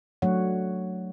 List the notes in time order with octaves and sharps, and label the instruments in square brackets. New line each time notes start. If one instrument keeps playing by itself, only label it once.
[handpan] F#3 A3 D4 C#5 F#5